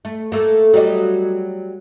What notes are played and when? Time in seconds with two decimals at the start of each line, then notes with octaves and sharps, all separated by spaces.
0.05 A3
0.32 A3 A#3
0.74 F#3 G3 D#5